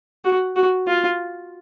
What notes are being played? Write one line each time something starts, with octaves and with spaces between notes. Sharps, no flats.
F#4
F#4
F4